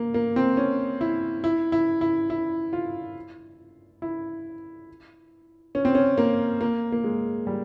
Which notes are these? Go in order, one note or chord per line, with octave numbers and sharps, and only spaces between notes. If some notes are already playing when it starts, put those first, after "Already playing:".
Already playing: A#3
A#3
C4
C#4
E4
E4
E4
E4
E4
F4
E4
C#4
C4
C#4
A#3
A#3
A#3
G#3
G3